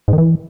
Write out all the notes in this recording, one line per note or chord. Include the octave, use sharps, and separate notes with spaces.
G#2
D#3
E3